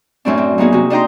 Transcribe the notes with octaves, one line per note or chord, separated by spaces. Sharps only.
F#2 A2 F#3 C4 D4
C4
F#3 A#3 B3 D#4 F#4 G#4
C3 F#4
D4 D#4 D#5 G5 A#5 C6